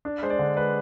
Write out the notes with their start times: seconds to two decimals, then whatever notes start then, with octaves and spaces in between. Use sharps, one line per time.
0.05 D4
0.22 G#3 C5
0.30 D5
0.39 D3
0.56 G#3 B4